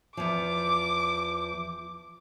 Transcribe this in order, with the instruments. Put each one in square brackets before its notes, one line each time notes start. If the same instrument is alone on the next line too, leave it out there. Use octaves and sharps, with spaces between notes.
[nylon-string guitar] E2 F3 [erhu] D6